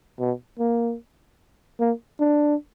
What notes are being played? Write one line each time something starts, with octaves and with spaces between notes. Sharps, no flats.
B2
A#3
A#3
D4